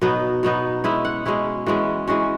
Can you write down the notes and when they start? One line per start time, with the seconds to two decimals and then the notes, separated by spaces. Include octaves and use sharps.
0.01 B2 F#3 B3 D#4 D#5
0.43 B2 F#3 B3 D#4
0.84 B2 G#3 C#4 E4 E5
1.05 F#5
1.25 B2 G#3 C#4 E4
1.66 E3 G#3 C#4 F#4
2.07 E3 G#3 C#4 F#4